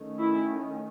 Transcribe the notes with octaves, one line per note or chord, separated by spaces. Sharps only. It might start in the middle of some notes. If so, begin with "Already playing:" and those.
Already playing: D#3 A3 C#4
E4